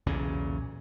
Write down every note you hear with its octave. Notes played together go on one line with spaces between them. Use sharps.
B1 E2 A#2 C#3